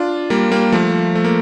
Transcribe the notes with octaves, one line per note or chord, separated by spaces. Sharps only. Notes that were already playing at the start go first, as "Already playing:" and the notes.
Already playing: D4 F4
G3 A#3
G3 A#3
F3 A3
A3
A#3